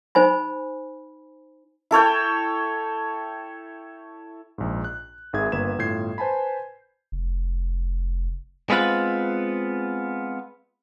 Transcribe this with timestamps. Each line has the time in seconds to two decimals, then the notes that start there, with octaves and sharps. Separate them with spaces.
0.15 D#4 C5 G#5 B5
1.91 E4 A4 C#5 G5
4.58 A#1 G#2
4.84 F#6
5.33 G#1 D#3 G#4 E5 G#6
5.52 G1 A#3 B4 G#6 E7
5.78 G1 A2 F4 G6 G#6 C7
6.18 B4 C5 G#5 A5 B5
7.12 F1
8.70 G#3 B3 C4 F4 B4